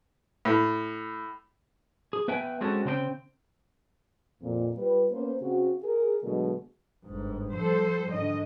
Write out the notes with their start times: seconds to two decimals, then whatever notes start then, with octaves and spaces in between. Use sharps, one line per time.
0.45 A2
2.13 G#4
2.28 B3 B4 E5 G5 G#5
2.61 G#3 C4 C#4 F#4 A4
2.85 C#3 C4 D4 G5
4.42 F2 A#2
4.76 G3 F4 B4
5.11 A#3 B3 C#4 C5
5.41 C#3 C4 F#4
5.83 G#4 A#4
6.24 B2 D3 F#3 G#3 A3
7.05 G1 G#2
7.55 F3 G3 A4 C5
8.09 G#2 D3 D#3 D#5